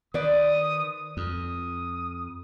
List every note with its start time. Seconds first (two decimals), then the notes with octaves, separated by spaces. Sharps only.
0.14 D#3 B4 C5 D5 D#6
1.17 F2 D#6